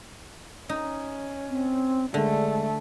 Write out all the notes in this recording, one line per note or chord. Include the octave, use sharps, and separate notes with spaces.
C#4 D#4
C4
D3 G#3 A3